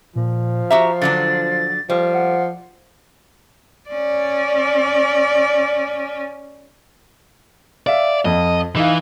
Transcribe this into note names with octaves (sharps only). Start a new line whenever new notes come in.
A#2 F3
F#4 G4 E5 A#5
D3 F#3 D4 A6
F3 G3
F#5
C#4 D5
D5 E5 F5
F2 D#5
E3 D#4 F5